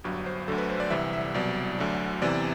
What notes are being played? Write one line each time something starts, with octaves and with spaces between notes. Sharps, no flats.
G1 G2 F#3
C5
D2 D3 F#3 A4
B4
C5
D5
C2 C3 E3 E5
E5
C2 B2 F#3 D5
D2 D3 F#3
E2 C3 E3 D5